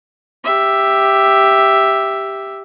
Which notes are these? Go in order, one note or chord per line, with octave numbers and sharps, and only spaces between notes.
G4 E5